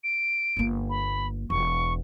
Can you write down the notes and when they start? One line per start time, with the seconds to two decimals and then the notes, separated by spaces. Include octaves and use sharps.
0.04 D7
0.57 G1 A#3
0.90 B5
1.50 E1 C#6